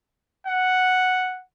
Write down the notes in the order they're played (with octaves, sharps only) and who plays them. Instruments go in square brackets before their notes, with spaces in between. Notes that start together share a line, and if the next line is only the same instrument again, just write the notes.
[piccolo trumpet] F#5